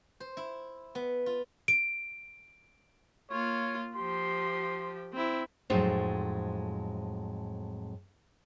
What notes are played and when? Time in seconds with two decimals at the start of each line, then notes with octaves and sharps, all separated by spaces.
0.20 C5
0.37 E4
0.95 B3
1.26 F4
1.68 D7
3.31 A#3 F4 C#5
3.96 F3 G4 C6
5.12 C4 E4
5.70 F2 A2 F#3 G#3 D#4 C5